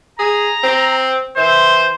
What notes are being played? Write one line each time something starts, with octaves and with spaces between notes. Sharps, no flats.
G#4 A#5
C4
E3 C5